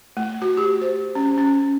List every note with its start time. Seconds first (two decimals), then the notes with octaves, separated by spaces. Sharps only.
0.17 A3
0.42 F#4
0.57 G4
0.81 C5
1.15 C#4
1.38 C#4